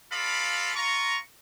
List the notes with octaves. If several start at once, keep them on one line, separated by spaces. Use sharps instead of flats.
F4 F#4 A4 D5 F5 B5
F4 A#5 C#6